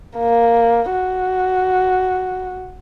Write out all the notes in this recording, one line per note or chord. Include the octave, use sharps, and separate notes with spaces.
A#3
F#4